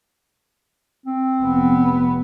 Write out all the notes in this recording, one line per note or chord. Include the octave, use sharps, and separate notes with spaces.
C4
F1 B3